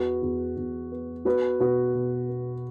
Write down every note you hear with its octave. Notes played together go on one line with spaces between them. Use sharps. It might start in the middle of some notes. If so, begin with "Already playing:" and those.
Already playing: E2 F#4 B4
E2
E2
B3
B3 F#4 B4
B2 F#4 B4
B2
B3